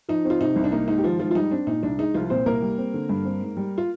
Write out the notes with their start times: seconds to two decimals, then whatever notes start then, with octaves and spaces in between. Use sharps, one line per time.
0.09 F3 D#4
0.25 C4
0.30 F4
0.41 C3 D#4
0.56 C2
0.64 D4
0.72 A#3 D#4
0.88 G#2 D#4
0.98 G4
1.04 D#3 F3 F4
1.19 G#2 F3 F4
1.31 F4
1.35 G3 D#4
1.51 C4 D4
1.67 A#2 D#4
1.83 C2 D4
1.98 G#3 D#4
2.14 C2 F3 F4
2.30 A#2 C4 C5
2.46 C2 A#3 A#4
2.62 G3
2.78 C4
2.94 D3
3.09 G2
3.25 C4
3.41 G#2
3.57 G3
3.78 F4